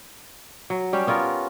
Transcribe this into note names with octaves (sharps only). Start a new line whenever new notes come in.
F#3
G3 C#4 G4
B3 C#4 F4 A#4